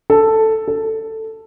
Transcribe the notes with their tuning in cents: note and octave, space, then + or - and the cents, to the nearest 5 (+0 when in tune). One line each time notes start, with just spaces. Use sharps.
A4 +5
A4 +10